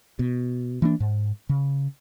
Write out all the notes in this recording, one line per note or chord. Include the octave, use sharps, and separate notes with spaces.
B2
E3 A#3 D4
G#2
C#3